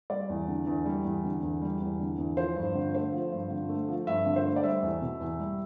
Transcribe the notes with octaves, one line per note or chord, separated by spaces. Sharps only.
G3 D5
E2
D3
E2
G3
E2
D3
E2
G3
E2
D3
E2
F3 C5
G2
D3
A3 C5
F3
G2
D3
A3
F3
G2 E5
D3
C5
A3
D5
G3 E5
E2
B2
E2
G3